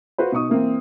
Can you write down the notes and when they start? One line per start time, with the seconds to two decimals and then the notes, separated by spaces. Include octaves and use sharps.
0.18 F4 F#4 B4 C5
0.32 B2 D#4 C#6 D#6
0.49 E3 A#3 C4